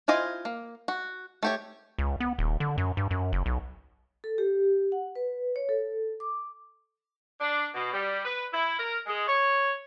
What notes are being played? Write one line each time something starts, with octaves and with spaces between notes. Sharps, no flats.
E4 F4 C5 D#5 G#5
A#3
F#4
A3 G4 C#5
C#2
B3
D#1
D3
F#2
G2
F#2
F#1
B1
A4
G4
F#5
B4
C#5
A4
D6
D4
B2
G3
B4
E4
A#4
G#3
C#5